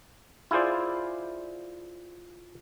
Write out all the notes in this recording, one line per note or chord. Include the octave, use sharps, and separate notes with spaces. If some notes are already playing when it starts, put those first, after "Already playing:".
E4 F4 G#4 C5 D5